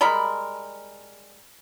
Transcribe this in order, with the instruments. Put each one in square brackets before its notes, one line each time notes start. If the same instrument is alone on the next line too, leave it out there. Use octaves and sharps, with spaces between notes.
[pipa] G3 G#3 A#4 B5